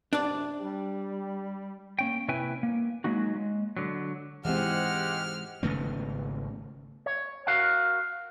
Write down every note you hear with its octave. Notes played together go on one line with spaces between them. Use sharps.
F#2 C3 D4 D5
G3 G4
A#3 C#4 G5
C3 C#4 E4 B4 G5 G#5
A#3
F#3 G#3 A#3 D#4 F#4
G#3
D3 F#3
G#2 C3 E3 G#3 C4 G4 F#5 F6
G#1 C#3 A3 B3
C#5
F#4 A#4 F5 F#5